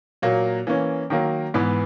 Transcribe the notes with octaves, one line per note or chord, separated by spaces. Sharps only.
A#2 F#3 A#3
E3 A#3 C#4
D#3 F#3 A#3
G#2 E3 B3